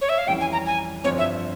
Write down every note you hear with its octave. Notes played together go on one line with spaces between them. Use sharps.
C#5
E5
F5
F2 E3 G3 C#4 G5
G#5
A#5
G#5
G1 G2 F3 C4 C#5
E5